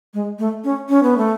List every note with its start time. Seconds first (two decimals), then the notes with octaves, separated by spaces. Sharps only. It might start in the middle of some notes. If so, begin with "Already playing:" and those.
0.14 G#3
0.39 A3
0.64 C#4
0.89 C#4
1.03 B3
1.18 A3